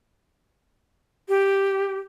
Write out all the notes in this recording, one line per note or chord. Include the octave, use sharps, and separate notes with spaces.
G4